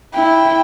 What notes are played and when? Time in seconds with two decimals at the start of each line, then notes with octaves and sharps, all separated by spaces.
0.14 E4 G5